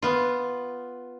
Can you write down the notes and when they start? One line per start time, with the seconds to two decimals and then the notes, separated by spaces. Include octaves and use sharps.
0.02 B3 F4